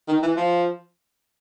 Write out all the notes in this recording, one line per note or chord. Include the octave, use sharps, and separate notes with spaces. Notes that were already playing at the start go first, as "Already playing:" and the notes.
D#3
E3
F3